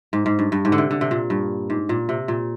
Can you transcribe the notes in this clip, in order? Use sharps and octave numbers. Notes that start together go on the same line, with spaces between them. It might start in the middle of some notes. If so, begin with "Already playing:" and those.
G#2
G#2
G2
G2
G#2
D3
C3
D3
C3
A#2
G2
G#2
A#2
C3
A#2